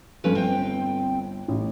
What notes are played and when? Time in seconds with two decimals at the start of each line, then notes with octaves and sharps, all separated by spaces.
0.24 G1 F3 C#4 A4 B4
0.35 C4 G5
1.48 A1